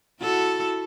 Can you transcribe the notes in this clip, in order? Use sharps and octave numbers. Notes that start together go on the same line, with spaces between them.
E4 F#4 A4